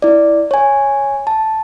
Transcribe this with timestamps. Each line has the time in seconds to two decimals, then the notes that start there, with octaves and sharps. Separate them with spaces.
0.02 E4 D5
0.51 C#5 G#5
1.27 A5